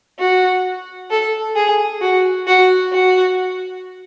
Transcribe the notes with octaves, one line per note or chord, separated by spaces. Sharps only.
F#4
A4
G#4
F#4
F#4
F#4